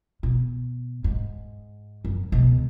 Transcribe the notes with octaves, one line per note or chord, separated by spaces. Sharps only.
B2
G#2
F#2
C#2 B2